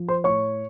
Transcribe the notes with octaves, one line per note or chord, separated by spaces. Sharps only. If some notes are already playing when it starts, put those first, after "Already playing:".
Already playing: F3
C5 C6
A2 C#5 C#6